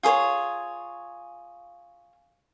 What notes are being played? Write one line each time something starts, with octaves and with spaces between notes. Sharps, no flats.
F4 G#4 C5 C#5